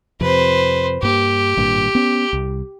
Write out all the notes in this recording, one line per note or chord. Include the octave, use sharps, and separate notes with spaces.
F2 C3 B4 C5
G2 A#3 G4
G#1 G2 A#2
B3 C#4
C2